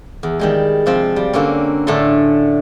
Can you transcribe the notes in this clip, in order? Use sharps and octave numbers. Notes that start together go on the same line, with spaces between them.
E2
D#3 G3 G#3
C3 F3 C4
G3
D3 A#3 C4 C#4
A2 D3 A3 C#4 A4 C6